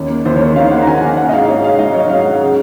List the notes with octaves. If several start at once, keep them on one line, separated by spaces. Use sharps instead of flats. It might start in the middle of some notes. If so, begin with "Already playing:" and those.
Already playing: D#2 C#4
A#3
D#2 C5
C#5
A#3
D#3 F5
A#3 F#5
A#5
D#3 G#5
F#5
A#3
G#5
C#4 F#5
D#5
G#2 F5
G#2 C#5
G#2 F5
G#2 D#5
F#3 C#5
G#2 F5
G#2 F#5
C#3